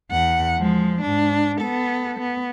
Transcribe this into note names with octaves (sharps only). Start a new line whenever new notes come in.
E2 F#5
F3 G#3
G#2 D4
B3 A4
B3